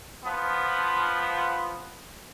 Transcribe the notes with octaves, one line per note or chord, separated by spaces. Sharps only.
F3 B3